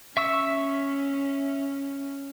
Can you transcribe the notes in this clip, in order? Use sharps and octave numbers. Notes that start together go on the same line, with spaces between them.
C#4 E5 C#6 E6